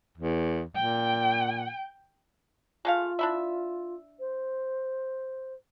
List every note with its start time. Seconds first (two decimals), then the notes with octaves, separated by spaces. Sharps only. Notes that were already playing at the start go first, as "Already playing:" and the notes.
0.18 E2
0.76 A#2 G5
2.85 G#3 A3 F4 F5
3.19 D4 E4 E5
4.19 C5